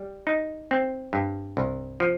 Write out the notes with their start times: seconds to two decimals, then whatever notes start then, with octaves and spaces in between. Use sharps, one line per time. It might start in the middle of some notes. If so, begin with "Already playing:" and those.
Already playing: G3
0.27 D#4
0.71 C4
1.13 G2
1.57 C2
2.00 F3